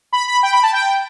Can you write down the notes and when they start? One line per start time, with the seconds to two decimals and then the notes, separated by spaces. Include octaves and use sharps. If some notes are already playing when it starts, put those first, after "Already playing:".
0.13 B5
0.28 B5
0.43 G5
0.53 B5
0.63 A5
0.73 G5